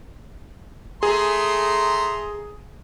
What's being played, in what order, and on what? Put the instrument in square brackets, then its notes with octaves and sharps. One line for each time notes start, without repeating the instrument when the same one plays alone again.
[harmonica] A3 A#5 C6 [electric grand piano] G#4